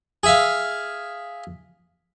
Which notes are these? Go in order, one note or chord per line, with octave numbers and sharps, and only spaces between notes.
G#4 E5 F5